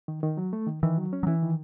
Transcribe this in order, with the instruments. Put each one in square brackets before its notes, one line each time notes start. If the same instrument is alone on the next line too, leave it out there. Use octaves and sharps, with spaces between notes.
[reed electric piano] D#3
D#3
F#3
A3
D#3
[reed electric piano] D#3 [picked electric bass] E3
[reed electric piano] F#3
C#4
[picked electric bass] F#3
[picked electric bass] E3 [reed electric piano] E4
[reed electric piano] D#3